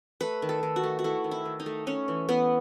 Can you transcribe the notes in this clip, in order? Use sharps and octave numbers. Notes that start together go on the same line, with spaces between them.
A3 B4
D#3
A4
D#3
F#4
A3
F#4
A3 E4
D#3
E4
D#3
D#4
A3
A3 C#4
E3
E3 B3